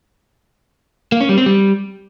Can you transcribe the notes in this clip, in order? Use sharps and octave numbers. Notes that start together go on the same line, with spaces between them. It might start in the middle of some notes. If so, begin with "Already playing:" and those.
A#3
C#4
G3
C4
G3